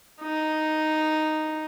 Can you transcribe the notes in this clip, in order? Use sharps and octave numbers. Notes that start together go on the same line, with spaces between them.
D#4